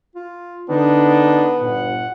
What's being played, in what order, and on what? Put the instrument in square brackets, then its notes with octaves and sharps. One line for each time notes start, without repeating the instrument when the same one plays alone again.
[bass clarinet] F4
[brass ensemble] D3 [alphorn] B3 [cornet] D4 [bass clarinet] D#4
[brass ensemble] G1 [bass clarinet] A#2 [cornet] F#5